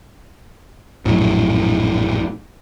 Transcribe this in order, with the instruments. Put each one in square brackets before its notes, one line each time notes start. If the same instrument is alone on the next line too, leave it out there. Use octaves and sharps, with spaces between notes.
[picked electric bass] A#1 F#2 A2